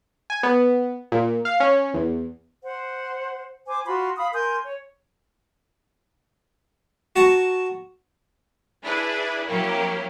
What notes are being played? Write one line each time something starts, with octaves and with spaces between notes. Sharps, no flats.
G#5
B3
A#2
F5
C#4
E2
C5 F#5
C5 G#5 D6
F4 F#4 B5 C6
F5 B5 D#6
A#4 G#5 C6 G6
C#5
F#4 A5 A#5 C#6
D4 E4 G#4 B4
F#3 A#3 C#4 E4 G4